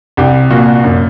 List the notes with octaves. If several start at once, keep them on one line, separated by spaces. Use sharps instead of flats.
C2 G4
A#2 F#4
F#2